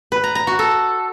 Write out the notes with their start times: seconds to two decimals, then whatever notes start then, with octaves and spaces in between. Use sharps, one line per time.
0.12 B4
0.24 A#5
0.35 A#5
0.47 F#4
0.59 A4